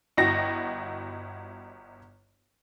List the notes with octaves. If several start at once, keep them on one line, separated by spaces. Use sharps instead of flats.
G1 E4 F#4 D#5 G5 A#6